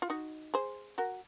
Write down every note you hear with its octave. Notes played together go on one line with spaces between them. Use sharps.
F4
D#4 F#4
G#4 C5
F#4 A#4